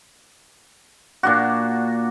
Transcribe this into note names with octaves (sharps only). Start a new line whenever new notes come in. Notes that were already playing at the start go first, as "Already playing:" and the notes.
A#2 D4 F#4